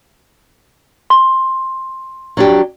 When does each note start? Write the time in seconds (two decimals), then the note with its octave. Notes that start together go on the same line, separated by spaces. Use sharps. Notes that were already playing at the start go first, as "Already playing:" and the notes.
1.10 C6
2.37 F#3 D4 G4